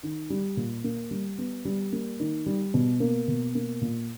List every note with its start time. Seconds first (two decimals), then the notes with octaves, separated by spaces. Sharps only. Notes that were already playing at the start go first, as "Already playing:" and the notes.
0.03 D#3
0.30 G3
0.57 A#2
0.84 A#3
1.11 G3
1.38 B3
1.65 G3
1.92 A#3
2.20 D#3
2.46 G3
2.74 B2
3.00 A#3
3.28 B2
3.55 A#3
3.81 A#2